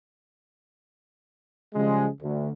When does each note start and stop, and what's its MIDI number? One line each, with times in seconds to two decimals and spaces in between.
1.75 2.07 49
1.75 2.07 53
1.75 2.07 55
1.75 2.07 56
2.21 2.50 38